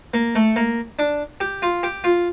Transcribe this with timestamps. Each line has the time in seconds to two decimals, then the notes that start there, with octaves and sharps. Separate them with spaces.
0.14 A#3
0.35 A3
0.56 A#3
0.99 D4
1.40 G4
1.62 F4
1.83 G4
2.04 F4